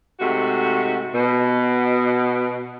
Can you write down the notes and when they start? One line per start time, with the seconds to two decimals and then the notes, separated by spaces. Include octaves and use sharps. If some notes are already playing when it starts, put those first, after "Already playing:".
0.20 G#2 C3 A3 F#4
1.15 B2